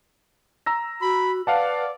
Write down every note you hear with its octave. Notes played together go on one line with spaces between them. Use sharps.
A#5 E6 A#6
F#4 B5
B4 D5 F5 F#5 A5